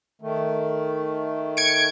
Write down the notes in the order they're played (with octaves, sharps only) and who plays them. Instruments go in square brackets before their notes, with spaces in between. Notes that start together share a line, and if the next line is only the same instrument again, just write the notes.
[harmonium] D#3 A3
[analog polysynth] G#6 C#7 D7